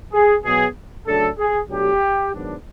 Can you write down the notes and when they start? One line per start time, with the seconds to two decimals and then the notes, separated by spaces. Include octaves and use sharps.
0.13 G#4
0.44 B2 F#3 B3 G#4
1.07 C#3 F#3 A3 D4 A4
1.38 G#4
1.69 B2 F#3 A3 D4 G4
2.32 G#2 D#3 F#3 B3 D4